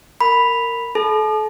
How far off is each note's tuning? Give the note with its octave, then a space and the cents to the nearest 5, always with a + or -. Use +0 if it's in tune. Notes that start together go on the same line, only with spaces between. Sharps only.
A#4 -15 B5 +0
A4 -35 A5 -35